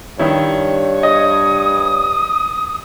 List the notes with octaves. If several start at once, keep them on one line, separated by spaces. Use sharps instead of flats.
G2 D#3 E4 C#5
D#5 D#6